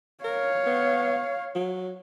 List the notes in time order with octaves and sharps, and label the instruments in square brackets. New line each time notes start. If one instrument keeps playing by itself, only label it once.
[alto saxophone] A#4 [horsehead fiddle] C#5 F5
[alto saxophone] B3
F#3